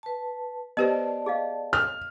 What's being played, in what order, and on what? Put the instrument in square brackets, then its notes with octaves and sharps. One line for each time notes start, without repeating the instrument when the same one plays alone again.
[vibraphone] B4 A5
[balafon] B3 G4 C5 [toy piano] B4 D#5 [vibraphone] D5 A5
[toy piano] G#4 D#5 F5
[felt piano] F6